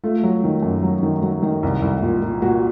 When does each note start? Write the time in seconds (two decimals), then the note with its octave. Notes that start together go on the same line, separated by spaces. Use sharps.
0.04 A3 F4
0.23 F#3
0.44 D#3
0.62 F#2
0.83 F#3
1.03 D#3
1.23 F#3
1.42 D#3
1.63 C2
1.82 C2
2.02 A#2
2.22 A#2
2.42 A#2 F#4